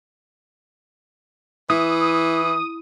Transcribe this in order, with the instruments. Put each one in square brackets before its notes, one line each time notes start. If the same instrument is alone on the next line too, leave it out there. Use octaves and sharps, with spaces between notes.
[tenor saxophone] E3 [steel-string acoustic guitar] E4 [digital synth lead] D#6